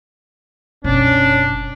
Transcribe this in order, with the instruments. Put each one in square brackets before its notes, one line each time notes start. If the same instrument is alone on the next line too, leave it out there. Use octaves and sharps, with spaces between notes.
[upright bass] F#1 B2 [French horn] C#4 [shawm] D4